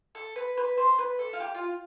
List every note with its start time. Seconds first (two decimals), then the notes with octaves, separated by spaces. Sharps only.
0.15 A4
0.36 B4
0.57 B4
0.77 C5
0.99 B4
1.19 A4
1.33 F4
1.40 G4
1.54 F4